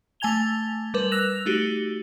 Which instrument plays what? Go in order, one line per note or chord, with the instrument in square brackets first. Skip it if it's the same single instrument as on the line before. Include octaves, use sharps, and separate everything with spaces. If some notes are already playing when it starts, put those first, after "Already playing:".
[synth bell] A3 G#5 A5 G#6 F7 G7
G3 A#4 B4
E6 F#6 A#6 E7 F7
A3 D#4 F#4 G4